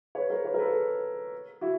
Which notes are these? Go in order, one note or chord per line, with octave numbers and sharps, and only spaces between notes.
B4 C#5
A#4 C5
B4 C#5
A#4
A4 B4
E4 F#4